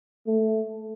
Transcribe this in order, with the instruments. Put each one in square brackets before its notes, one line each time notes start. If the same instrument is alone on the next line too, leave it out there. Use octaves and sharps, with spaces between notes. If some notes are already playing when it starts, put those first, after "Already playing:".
[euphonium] A3